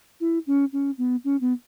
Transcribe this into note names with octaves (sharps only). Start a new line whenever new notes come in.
E4
C#4
C#4
B3
C#4
B3